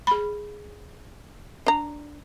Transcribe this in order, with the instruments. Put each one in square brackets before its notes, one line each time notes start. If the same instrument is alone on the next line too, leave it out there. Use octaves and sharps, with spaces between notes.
[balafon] G#4 B5
[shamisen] D4 A#5